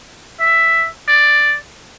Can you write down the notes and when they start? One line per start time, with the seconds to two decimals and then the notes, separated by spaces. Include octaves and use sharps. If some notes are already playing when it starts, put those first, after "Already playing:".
0.40 E5
1.08 D5